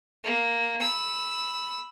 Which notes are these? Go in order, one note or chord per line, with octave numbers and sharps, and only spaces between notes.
A#3
B5 E6